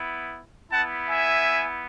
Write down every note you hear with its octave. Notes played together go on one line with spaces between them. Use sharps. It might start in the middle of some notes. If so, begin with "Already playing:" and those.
Already playing: B3 E4
B3 E4 F#5 A5
E5 G#5